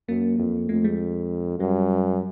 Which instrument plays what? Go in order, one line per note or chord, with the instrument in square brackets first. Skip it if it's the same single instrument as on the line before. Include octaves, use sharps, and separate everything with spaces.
[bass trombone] F#2 [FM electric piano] A#3
[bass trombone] F2
[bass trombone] F2 [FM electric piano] A3
[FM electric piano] G#3
[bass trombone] F#2 [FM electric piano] G3